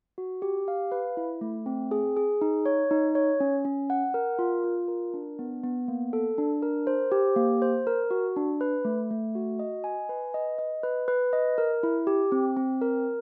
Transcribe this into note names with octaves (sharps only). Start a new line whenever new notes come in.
F#4
G4
F5
B4
E4
A3
C4
G#4
G#4
D#4
C#5
D#4
C#5
C#4
C#4
F#5
A#4
F4
F4
A#4
D4
B3
B3
A#3
A4
D4
A#4
C5
G4
A#3
C5
A#4
F#4
D4
B4
A3
A3
F#4
D#5
G#5
B4
D#5
D#5
B4
B4
D#5
A#4
E4
G4
C4
C4
A#4